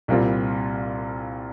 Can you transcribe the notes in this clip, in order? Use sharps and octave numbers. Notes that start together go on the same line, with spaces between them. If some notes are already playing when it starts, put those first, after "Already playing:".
C2 A#2 G3 C4 F4